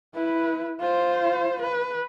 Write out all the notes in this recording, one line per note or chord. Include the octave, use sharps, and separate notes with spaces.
E4 B4
F4 C5
B4